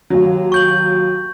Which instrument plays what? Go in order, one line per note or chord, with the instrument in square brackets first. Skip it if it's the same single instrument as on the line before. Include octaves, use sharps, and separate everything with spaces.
[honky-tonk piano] D#2 F#3
[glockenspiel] C#6 G6 F#7